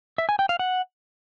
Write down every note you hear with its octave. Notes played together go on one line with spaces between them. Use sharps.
E5
G#5
G5
F5
F#5